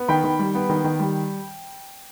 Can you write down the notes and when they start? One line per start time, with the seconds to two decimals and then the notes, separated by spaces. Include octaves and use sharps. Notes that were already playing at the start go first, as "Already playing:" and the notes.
Already playing: B3
0.08 D#3 G5 B5
0.24 D#3
0.39 G3
0.55 B3
0.69 D#3
0.84 D#3
0.99 G3